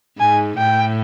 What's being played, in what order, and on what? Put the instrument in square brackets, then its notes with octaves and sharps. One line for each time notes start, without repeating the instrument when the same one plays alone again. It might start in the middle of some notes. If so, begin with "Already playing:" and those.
[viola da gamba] G#2 [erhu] G#5
[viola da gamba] A2 [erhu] G5